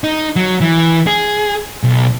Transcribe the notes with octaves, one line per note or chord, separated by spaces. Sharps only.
D#4
F#3
E3
G#4
B1